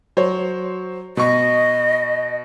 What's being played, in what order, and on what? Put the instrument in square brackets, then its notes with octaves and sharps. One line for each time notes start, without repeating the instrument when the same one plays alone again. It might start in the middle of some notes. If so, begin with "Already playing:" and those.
[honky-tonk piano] F#3 C5 C#5
[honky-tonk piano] B2 C#6 [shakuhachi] D#5